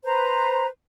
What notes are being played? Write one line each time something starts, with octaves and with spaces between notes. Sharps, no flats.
B4 C5 A#5